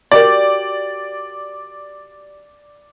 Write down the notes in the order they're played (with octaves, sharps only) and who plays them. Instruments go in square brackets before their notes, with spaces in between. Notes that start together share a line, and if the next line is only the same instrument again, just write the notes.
[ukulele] F#4 G4 A#4 [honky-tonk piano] D5